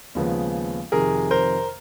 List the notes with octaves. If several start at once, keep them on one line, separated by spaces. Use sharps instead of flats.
D#2 C#3 F3 G#3 B3
F2 C3 D#3 G#4 A#4
A#4 C5